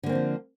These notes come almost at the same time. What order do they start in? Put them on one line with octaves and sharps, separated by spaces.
D3 A#3 C4 D#3 F3